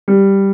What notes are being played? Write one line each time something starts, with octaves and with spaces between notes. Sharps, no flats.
G3